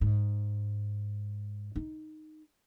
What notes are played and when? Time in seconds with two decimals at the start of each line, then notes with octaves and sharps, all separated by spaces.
0.01 G#2
1.76 D#4